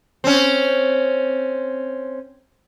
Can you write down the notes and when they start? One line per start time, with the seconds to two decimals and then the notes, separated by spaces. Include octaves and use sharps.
0.24 C4 C#4